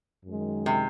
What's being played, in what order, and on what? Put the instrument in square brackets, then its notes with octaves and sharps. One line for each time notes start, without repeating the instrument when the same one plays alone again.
[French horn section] F#2 D#3 G#3
[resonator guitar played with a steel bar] C3